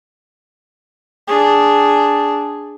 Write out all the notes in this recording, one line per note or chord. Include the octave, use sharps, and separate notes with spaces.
D4 G#4